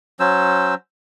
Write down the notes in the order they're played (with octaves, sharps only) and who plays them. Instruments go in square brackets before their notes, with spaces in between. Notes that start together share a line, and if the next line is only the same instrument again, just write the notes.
[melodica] F#3 C#4 C5 E6